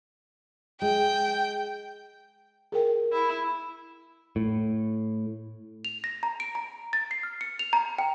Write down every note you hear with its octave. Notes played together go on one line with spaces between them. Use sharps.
G#3 G5
G#4 A#4 G5
E4
A2
F7
A#6
A#5
D7
A#5
A6
C7
F6
C#7
F7
A#5
G5